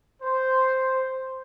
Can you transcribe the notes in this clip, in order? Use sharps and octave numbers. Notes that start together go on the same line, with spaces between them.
C5